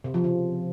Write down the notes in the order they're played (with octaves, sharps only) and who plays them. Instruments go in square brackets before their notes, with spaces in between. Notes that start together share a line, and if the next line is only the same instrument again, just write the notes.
[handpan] C3
F3
C#3